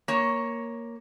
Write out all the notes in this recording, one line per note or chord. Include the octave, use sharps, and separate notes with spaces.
A#3 C#5